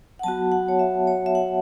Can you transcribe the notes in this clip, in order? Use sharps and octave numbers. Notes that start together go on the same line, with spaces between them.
F#5
F#3 B3 F#4 A5
F#5
C#5
E5
C#5
E5
F#5